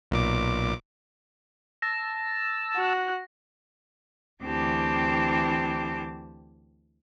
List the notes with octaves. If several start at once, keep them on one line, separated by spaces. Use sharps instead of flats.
B1 A#2 D6
A5 E6 A#6
F#4 F#6
D2 E3 C4 G4 A5 D6